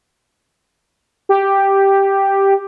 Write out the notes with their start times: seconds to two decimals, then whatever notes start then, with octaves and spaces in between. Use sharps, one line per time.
1.29 G4